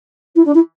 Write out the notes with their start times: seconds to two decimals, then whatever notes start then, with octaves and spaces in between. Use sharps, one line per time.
0.35 E4
0.45 D4
0.54 E4